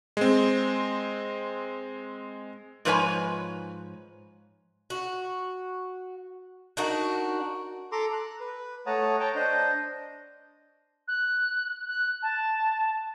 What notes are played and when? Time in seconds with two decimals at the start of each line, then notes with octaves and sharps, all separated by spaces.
0.17 G#3 C4
2.85 G#2 F3 B4 C#5 G#5
4.90 F#4
6.77 D4 D#4 F#4 A#4
7.92 A4 A#5 C6 D6
8.13 F#6
8.40 B4
8.86 A3 C#5 F#5 A5 A#5 D#6
9.20 C#5 G5 A5 A#5
9.35 D4 C5 D#5
11.08 F#6
11.88 F#6
12.22 A5